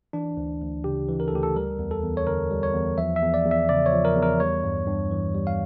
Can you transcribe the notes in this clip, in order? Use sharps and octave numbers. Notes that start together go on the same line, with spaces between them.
E3 D4
D2
D2
C#3 G4
E3
A#4
A4
D2 G4
A4
G3 A#4
E2
A4
E2
C#5
D3 A#4
G3
C#5
E2
F3 E5
E5
E2
D5
E2
E5
C#3 D5
C#5
F3
A#4
E2
A#4
G3 C#5
G2
G2
E3
G3
F5